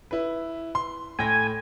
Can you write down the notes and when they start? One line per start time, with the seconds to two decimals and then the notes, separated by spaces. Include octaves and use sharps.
0.11 E4 B4
0.75 C6
1.19 A2 G5 G#5 A#6